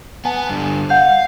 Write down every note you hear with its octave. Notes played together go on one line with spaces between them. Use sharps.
B3 G#5 A5
G2 D3
F5 F#5 G6